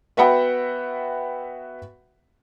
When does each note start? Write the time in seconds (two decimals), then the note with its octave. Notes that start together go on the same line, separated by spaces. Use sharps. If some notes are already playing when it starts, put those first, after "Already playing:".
0.17 B3 F#4 E5 F#5 G5 B5